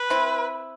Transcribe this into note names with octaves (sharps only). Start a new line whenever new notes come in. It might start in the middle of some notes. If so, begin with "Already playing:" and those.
Already playing: B4
C4 E4